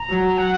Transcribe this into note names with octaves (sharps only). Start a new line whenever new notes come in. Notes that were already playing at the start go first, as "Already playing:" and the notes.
Already playing: A#5
F#3
F#5